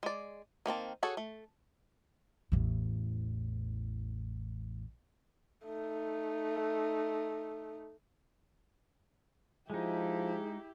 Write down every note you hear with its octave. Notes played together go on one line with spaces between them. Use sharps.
G#3 D5
D#3 A#3 C4 A5
F#4 G#4 A4 C#5
A3
A1 E2
A3 D#4
F3 G#3 D#4 E4 G4 G#4